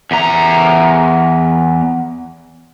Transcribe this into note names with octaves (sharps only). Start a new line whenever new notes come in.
E2 A#5